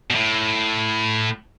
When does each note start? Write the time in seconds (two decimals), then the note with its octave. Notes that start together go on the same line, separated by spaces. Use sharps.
0.10 B2
0.15 A2